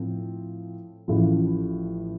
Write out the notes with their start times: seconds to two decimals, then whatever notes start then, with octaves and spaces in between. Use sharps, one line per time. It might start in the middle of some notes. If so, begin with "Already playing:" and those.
Already playing: A2 F3 C4
1.08 A1 A2 F3